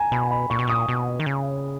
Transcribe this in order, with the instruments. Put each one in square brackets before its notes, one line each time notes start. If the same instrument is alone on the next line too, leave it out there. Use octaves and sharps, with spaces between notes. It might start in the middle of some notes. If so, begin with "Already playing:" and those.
Already playing: [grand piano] G#5 A#5
[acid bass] B2 [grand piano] B5
[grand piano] B5
[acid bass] A#2 [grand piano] C#6
[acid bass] B2
[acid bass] A#2 [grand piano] D#6
[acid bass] B2
D#3
C#3